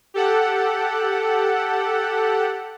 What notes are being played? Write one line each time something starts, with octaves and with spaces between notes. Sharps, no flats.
G4 A4 F#5